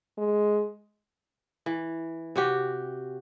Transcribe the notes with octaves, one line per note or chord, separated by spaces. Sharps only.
G#3
E3
C3 F#4 G4